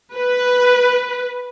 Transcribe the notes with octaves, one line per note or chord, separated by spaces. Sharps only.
B4